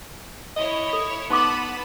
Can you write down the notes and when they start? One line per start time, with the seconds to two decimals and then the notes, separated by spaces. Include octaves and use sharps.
0.57 E4 C#5 D#5
0.93 A4
1.30 B3 D#4 F#5 A5 B5 C6 D6